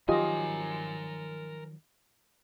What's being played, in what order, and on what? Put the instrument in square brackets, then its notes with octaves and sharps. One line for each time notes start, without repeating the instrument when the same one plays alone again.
[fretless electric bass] D#3 F3 F#3 [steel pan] F4 G4 D#5 [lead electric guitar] A#4 G#5